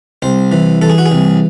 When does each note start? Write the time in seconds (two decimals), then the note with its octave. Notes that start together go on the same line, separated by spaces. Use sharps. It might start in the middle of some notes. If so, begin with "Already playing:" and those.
0.22 C2 C5
0.52 E3
0.82 E3 A4
0.90 G#4
0.98 F#4
1.06 G#4
1.12 C2